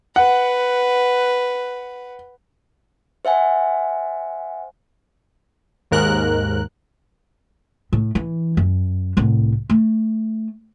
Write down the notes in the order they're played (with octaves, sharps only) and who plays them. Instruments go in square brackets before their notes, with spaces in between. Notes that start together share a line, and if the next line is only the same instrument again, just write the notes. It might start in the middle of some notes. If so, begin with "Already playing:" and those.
[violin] B4 [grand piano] F#5
[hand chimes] C5 E5 F#5 G#5
[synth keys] D#2 G#2 A#4 F#6
[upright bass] A2
E3
F#2
C2 A2
A3